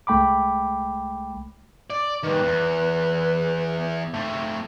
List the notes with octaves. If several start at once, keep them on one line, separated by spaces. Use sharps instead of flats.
C2 G#3 A3 G5 B5 D6
D5
D#3 G3 B4
E2
A3 C4